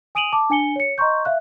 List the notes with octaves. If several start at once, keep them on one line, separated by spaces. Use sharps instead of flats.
G#5 D#6 D7 D#7 F7 F#7
A5 D6
D4 G#5 C#7 G7
C#5 C#7
D#5 A#5 C6 C#6 G6
E5 F5 F#6